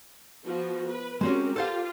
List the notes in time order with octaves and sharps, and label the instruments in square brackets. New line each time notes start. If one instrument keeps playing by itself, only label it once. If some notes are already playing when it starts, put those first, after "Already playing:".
[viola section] F3 B3 F#4
B4
[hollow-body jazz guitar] G#3 C4 C#4 [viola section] F#4 G4 A#4
[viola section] F4 G4 [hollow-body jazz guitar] A4 C5 F5